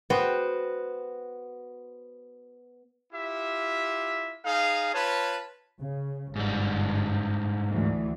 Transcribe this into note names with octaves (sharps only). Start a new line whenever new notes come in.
B3 F#4 C5 G5
E4 F4 G4 E5
D#4 G#4 F5
F4 B4 C#5 A5
C#3
G1 G#2 G3
D2 E3